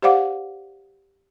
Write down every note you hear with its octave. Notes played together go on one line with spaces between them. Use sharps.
G4 C5 D5 F5 F#5 D6